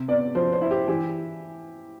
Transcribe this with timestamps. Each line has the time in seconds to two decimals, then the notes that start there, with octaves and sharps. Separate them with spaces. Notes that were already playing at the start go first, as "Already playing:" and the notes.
Already playing: C3
0.08 B3 D5
0.35 F3 C5
0.52 C5
0.61 E4
0.71 G4
0.88 E3 G4